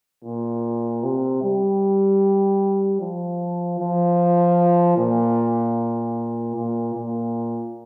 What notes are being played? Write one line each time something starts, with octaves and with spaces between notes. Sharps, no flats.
A#2
C3
G3
F3
F3
A#2
A#2
A#2